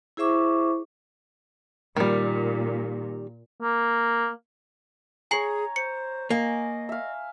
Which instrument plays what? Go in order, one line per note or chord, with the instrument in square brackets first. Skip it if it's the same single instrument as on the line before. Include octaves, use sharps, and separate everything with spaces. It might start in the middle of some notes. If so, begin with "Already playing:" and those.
[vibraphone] E4 G#4 C5 E5 C#6 D6
[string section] A#2 [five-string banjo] D#3 G3
[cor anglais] A#3
[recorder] G#4 [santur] C#5 A#5 [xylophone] G#5 C7 F#7
[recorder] C5 [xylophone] C#7
[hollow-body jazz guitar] A#3 [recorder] D#5 [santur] G#5
[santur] E5 F5